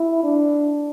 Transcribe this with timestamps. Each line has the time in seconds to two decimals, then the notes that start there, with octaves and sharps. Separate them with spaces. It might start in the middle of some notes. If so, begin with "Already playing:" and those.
Already playing: E4
0.23 D4